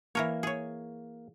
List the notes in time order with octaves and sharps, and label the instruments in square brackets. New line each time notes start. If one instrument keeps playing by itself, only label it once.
[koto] E3 A#4 C#5 [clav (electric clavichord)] A#3
[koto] G#4 C#5